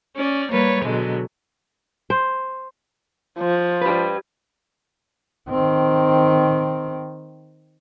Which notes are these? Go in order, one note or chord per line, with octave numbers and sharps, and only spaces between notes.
C#4 D5
G3 A#3 B4 C#5
B2 D3 F#3 G#3
C5
F3
G4 B4
D#3 C4